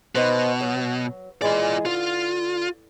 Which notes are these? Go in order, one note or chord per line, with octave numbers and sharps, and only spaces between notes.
B2 D#4 B4 C5
F#3
E3 G#3 F4 G#4 D5
D3 F4